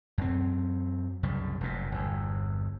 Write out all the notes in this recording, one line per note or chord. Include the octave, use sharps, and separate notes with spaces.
F#2 C4
C2 F#2 C#3 G3
F1 F#2 A#2
G1 E2